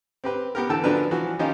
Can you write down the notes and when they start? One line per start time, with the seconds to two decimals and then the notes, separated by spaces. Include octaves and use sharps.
0.24 C4 G4 B4
0.55 B3 G4 A#4
0.69 D3 E3 G5 A5 E6
0.84 D3 F3 F#3 D4 A#4 B4
1.11 E3 F3 F#4
1.39 D#3 F3 C#4 D#4 F4 G4